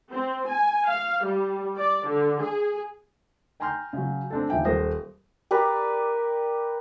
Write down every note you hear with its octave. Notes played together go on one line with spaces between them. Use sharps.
C4
G#5
F5
G3
D5
D3
G#4
G5 G#5 A#5 C6 F6 G6
C#3 F#3
C4 D4 A4
D#2 F3 E5 G5 G#5
D#1 A#4 C5 D#6 A#6
G4 A#4 B4 D5